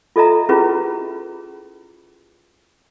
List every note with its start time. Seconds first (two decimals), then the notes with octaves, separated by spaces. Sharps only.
0.16 F4 A4 D#5 E5 A#5
0.49 C#4 E4 F4 G4 G#4 B4